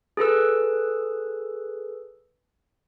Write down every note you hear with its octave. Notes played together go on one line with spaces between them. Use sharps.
G#4 A4 B4 E6